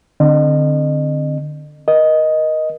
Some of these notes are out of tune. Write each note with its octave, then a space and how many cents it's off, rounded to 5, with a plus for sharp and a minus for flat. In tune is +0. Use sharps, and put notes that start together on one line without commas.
D3 +25 C4 +0 D#5 -35
A#4 +35 D#5 +5